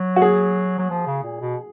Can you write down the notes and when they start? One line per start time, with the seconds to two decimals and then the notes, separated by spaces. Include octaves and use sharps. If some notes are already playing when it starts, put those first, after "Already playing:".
Already playing: F#3
0.16 F#4
0.22 G#4
0.79 F#3
0.90 F3
1.06 C#3
1.24 A#2
1.41 B2